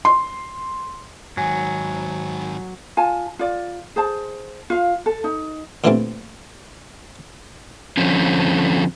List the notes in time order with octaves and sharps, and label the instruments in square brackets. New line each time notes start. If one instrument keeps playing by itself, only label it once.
[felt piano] C6
[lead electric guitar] G#2 D#3 [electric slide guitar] F#3 [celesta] G#5
[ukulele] F4 G#5 A5
F4 D5
G#4 C5 A5
F4 F5
A4
D#4
[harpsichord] A#2 D3 E3 G3 A3 C4
[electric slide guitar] D3 F3 C4 C#4